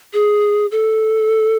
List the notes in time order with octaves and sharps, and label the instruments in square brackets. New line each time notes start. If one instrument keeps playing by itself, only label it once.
[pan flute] G#4
A4